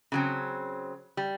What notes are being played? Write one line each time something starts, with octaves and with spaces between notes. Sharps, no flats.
C#3 F#3 C4
G3